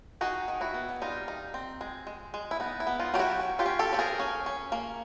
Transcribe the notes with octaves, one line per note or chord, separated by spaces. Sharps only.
D#4 F#4 G#4
D#3
E4 F#4
B3
G3 D#4 F4
D#4
C4
G#3
G#3
G#3
E4
B3 D#4
E4
B3
D#4 F4
F#3 G4
E4 F#4
C#4
F4 G4
C#4
G4 A4
F3 A4
G#4 A#4
C#4
C#4
A#3